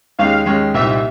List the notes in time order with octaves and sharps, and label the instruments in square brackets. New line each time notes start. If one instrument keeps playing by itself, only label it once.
[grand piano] D#2 D#3 G#3 C#4 [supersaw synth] F5
[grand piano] D#2 D#3 G#3 C#4
[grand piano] C2 A#2 G3 C4 D#4 [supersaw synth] E5